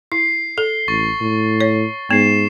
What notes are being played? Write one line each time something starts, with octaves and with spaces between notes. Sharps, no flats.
E4 C7
A4 G7
A1 C#6 A6 C7
A2
C#5
G#2 B3 C7 E7